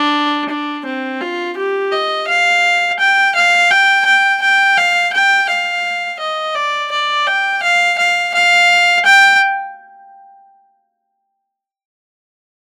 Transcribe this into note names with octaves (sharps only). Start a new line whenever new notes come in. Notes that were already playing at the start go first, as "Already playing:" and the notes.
Already playing: D4
D4
C4
F4
G4
D#5
F5
G5
F5
G5
G5
G5
F5
G5
F5
D#5
D5
D5
G5
F5
F5
F5
G5